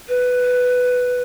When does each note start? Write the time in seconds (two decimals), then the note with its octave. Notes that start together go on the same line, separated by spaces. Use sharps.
0.09 B4